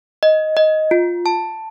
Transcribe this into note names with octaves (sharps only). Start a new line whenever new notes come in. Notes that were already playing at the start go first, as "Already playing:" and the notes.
D#5
D#5
F4
A5